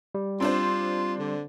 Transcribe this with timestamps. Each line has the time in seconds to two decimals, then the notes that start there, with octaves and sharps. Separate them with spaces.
0.15 G3
0.40 C4 D4 F4 C5
1.19 D3